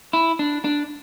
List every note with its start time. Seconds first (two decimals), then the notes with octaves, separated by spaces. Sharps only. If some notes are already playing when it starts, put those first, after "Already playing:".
0.13 E4
0.39 D4
0.64 D4